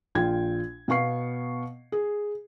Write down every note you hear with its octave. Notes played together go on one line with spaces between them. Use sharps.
A#1 F4 G5 G#6
B2 B3 F5 C#6 C7
G#4